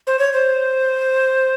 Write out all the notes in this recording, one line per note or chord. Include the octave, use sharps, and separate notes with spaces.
C5
C#5
C5